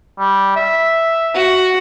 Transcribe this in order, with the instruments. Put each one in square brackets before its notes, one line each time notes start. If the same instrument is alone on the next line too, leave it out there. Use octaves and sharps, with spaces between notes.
[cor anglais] G3
E5
[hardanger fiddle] F#4